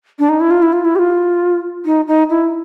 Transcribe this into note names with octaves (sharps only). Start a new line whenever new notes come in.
D4
D#4
E4
F4
E4
F4
E4
G4
F4
D#4
D#4
E4